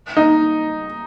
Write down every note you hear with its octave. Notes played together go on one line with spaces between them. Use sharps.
D#4